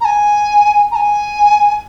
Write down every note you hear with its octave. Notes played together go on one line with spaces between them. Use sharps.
A#5
G#5
A#5
G#5